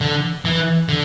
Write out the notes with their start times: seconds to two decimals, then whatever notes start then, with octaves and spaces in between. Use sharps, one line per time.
0.01 D3
0.45 E3
0.89 D3